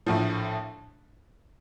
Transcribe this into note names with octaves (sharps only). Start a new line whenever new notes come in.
A#1 A2 F3